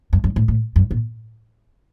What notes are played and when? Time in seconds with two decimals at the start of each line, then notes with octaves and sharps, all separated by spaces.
0.13 F#2
0.24 F#2
0.36 A2
0.48 A2
0.76 F#2
0.91 A#2